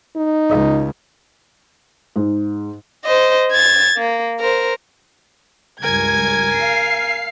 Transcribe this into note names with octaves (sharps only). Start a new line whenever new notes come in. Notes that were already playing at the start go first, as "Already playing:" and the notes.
D#4
C#2
G#2
C5 D#5
G#6 A6
A#3
A#4 C5
C#2 G2 A#4 G#5 G#6
F5 C7